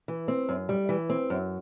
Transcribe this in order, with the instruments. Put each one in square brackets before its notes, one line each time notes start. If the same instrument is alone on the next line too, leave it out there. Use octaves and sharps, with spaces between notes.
[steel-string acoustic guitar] E3
C4
F#2
G3
E3
C4
F#2